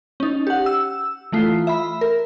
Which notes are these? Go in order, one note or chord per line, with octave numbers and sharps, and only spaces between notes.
C#4 D#4
G4 F#5
E6
E3 A3 F4 C7
E5 B5
A#4